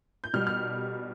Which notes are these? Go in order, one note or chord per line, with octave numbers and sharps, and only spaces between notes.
G6
B2 G3 F6
F6